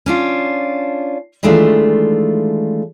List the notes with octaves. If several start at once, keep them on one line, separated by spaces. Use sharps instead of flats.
C#4 D4 F4
D#3 E3 G#3 A3 D4 F4